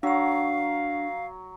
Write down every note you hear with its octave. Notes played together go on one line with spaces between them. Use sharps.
F#3 D4 F5 C#6